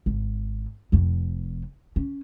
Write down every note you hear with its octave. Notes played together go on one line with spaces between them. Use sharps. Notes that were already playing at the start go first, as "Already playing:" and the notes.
G#1
F1 F2
C#4